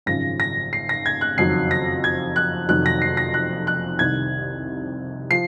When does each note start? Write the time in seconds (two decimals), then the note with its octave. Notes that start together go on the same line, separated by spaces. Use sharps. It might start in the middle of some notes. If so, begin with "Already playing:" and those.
0.06 G#1 F#2 C#3 F3 A#6
0.40 A#6
0.73 C7
0.89 A#6
1.06 G#6
1.21 F#6
1.37 F#1 F2 D#3 F#3 C7
1.71 A#6
2.04 G#6
2.36 F#6
2.68 F1 F2 D#3 F#3 F#6
2.86 A#6
3.02 C7
3.17 A#6
3.34 F#6
3.67 F#6
3.99 C2 C3 D#3 G#6
5.31 F3 C7